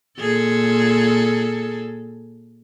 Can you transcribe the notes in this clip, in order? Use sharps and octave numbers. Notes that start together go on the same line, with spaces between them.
A#2 G#4 A4